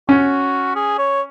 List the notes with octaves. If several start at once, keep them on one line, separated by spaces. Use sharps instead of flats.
C#4 F#4
G#4
C#5